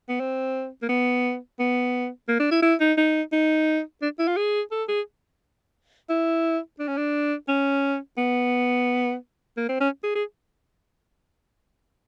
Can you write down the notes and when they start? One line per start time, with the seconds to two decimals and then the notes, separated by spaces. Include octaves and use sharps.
0.09 B3
0.20 C4
0.82 A#3
0.89 B3
1.60 B3
2.29 A#3
2.40 D4
2.51 E4
2.62 E4
2.80 D#4
2.98 D#4
3.32 D#4
4.02 D4
4.19 E4
4.28 F4
4.37 G#4
4.72 A4
4.88 G#4
6.10 E4
6.79 D4
6.88 C#4
6.97 D4
7.48 C#4
8.18 B3
9.57 A#3
9.69 C4
9.81 C#4
10.04 G#4
10.16 G#4